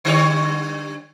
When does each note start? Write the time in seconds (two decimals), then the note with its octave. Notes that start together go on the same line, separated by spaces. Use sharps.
0.05 D3 G3 C#5